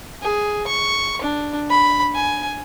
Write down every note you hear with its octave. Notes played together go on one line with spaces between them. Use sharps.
G#4
C#6
D4
B5
G#5